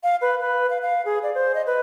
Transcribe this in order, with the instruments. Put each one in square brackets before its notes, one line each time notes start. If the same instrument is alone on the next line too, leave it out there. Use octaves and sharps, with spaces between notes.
[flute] F5
B4
B4
F5
F5
G#4
D5
C5
D#5
B4